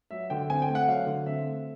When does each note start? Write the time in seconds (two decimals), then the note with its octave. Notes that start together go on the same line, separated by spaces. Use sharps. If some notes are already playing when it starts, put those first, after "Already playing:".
0.11 F#3 E5
0.30 D3 G5
0.50 C4 G#5
0.62 G5
0.68 A3
0.75 F#5
0.88 F#3 F5
1.07 D3
1.26 C4 E5
1.45 A3